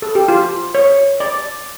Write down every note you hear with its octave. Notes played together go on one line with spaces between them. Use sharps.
A4
G4
F4
C#5
D5